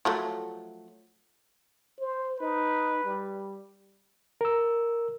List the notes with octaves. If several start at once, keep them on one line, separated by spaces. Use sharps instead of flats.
F3 F#3 A3
C5
D#4 B4
G3
A#4 E6